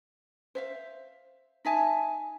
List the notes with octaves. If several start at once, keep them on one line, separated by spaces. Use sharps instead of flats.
C5 E5 F5
D#4 E5 G#5 A5